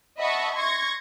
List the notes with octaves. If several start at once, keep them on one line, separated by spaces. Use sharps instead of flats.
D#5 E5 F#5 A5 B5 C#6
C6 C#6 G#6 A#6